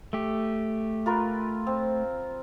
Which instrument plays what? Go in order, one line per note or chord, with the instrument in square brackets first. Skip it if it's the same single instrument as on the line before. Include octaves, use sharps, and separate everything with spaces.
[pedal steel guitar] A3 G4
[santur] F4 A#4 B4
C4